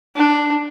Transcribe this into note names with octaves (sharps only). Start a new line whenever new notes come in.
D4